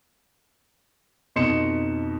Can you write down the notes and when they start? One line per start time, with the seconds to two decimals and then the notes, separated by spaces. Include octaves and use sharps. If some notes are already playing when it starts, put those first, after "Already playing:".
1.36 F2 B2 D#4 C6 C#7 E7